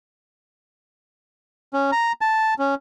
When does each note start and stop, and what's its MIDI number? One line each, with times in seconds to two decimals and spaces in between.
1.73 1.91 61
1.92 2.12 82
2.21 2.54 81
2.59 2.75 61